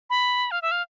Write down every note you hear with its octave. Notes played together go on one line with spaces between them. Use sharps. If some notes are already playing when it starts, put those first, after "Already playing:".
B5
F5
E5
F5